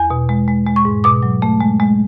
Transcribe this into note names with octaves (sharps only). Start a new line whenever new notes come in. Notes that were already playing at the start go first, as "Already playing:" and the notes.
Already playing: E2 G#5
B2
G#3
G#3
G#3
C#6
G#2
B2 D6
F#3
A3
G#3
G#3